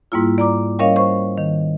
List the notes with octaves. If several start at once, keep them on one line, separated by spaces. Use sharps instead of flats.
G#2 G3 A#3 E4 F4
D5 A#5 D6
G3 C#4 A#4 C#5 D#5 F5
C5 C#6
D#3